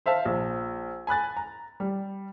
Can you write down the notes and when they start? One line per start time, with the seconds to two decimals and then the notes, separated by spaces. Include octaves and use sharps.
0.06 C5 E5 F5 A5
0.25 A#1
1.07 G#5 B5 F#6 A6
1.37 A#5
1.80 G3